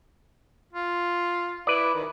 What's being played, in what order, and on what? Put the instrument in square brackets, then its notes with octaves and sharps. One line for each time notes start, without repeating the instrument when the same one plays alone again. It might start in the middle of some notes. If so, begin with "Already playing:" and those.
[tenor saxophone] F4
[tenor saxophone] E4 [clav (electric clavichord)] B4 D5
[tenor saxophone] D#3